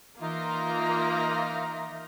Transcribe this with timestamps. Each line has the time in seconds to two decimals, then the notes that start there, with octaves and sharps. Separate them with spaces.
0.20 E3 A#3 D#4 F4 A#4 E5 A#5